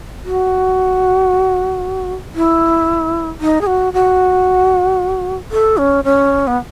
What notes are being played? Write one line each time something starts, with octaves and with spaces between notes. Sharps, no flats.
F#4
E4
D#4
G#4
F#4
F#4
A4
C#4
C#4
B3